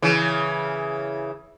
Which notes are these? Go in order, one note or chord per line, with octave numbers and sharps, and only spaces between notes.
C#3 E3